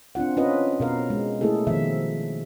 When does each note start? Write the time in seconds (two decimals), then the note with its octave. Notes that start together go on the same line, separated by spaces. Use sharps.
0.15 C4 D4 F4 F#5
0.37 C#4 F4 B4 D#5
0.80 B2 A#4 F5
1.10 G#3
1.41 A3 A#3 E4 G#4 A4
1.67 B2 D#3 F3 E5